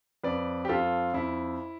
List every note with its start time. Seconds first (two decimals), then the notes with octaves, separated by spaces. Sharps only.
0.24 F2 B4 D5
0.65 G4
0.69 F2 F4 A4
1.14 F2 E4